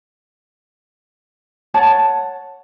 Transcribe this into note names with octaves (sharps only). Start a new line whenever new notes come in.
C#5 F#5 A5